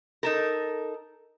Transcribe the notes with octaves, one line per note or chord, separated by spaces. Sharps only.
D#4 A4 A#4